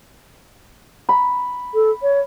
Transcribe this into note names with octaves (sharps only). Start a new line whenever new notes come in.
B5
A4
C#5